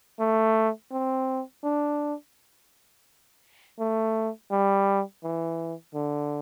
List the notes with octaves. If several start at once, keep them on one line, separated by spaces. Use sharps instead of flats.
A3
C4
D4
A3
G3
E3
D3